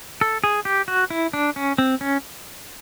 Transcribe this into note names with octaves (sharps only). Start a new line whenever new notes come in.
A4
G#4
G4
F#4
E4
D4
C#4
C4
C#4